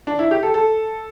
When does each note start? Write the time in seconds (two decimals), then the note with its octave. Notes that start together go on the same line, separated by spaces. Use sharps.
0.07 D4
0.19 E4
0.31 G4
0.43 A4
0.54 A4